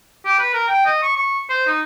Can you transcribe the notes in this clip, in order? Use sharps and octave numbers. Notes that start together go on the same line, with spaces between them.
G4
B4
A#4
G5
D#5
C#6
C#6
C5
D#4